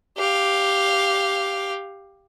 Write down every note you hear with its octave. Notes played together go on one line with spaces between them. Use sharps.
G4 F5